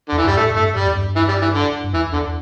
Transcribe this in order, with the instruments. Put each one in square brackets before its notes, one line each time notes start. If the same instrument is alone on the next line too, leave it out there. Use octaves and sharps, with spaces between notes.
[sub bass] E2 [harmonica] D3
[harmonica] E3
[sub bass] G2 [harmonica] G3
[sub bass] A2 [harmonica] A3
[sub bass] G2 [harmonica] A3
[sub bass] G2 [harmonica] G3
[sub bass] E2
G2
[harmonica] E3
G3
E3
D3
[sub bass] G2
[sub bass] E2 [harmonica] E3
[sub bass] E2 [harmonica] D3